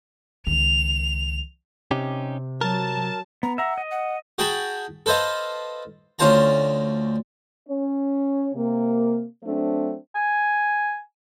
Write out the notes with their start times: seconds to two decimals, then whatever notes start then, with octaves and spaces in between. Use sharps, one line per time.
0.47 C#2 D#3 F7
1.91 C3 C#4 D#4 G4
2.61 F#3 A#4 A5
3.43 B3 A#5
3.58 E5 F#5 A#5
3.78 D#5
3.91 F#5
4.38 F#4 G#4 G5 A5 B5
5.06 A4 B4 C5 D#5 F5
6.19 D2 C#4 F4 C5 A5 A#5
7.69 C#4 C#5
8.54 C3 A#3
9.45 F#3 A3 C4 D4 C5
10.16 G#5